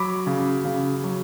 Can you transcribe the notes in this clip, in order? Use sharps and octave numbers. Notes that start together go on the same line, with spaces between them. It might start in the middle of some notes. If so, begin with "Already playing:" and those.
Already playing: F#3 B5 D6
C#3
C#3
F#3